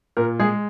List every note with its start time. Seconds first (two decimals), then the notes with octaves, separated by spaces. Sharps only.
0.17 A#2 A#4
0.40 G#3 G#4